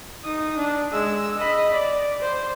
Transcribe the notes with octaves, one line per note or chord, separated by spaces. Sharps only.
D#4 D#6
D4
G#3 E6
D#5 B5
D5
C5